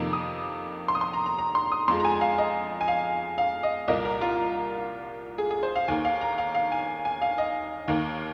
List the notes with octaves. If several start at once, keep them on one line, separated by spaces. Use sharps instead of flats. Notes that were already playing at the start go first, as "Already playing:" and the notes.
Already playing: F2 C3 D#3 A#3
D#6
C6
D#6
C6
A#5
A#5
A#5
C6
D#6
F2 F3 G#3 C6
A#5
G#5
F5
D#5
G#5
F5
F5
D#5
C2 A#2 A#3 D#5
A#4
F4
G#4
G#4
C5
F5
D#2 D#3 A#3 G#5
F5
A#5
F5
F5
G#5
G#5
F5
D#5
D#2 D#3 A#3